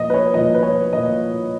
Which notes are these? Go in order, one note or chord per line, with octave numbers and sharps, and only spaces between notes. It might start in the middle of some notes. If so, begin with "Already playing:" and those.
Already playing: A#2 F3 D#5
B4
C#5
A#2 F3 D#5
B4
C#5
A#2 F3 D#5